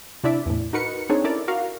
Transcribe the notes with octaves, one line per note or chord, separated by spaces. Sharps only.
C3 D4 E4 D5 E5
E2 A2
D#4 F#4 A#4 B4 C#7
C4 D4 D#4 G#4 C#5
C#4 E4 A4 A#4 D5
F#4 A#4 F5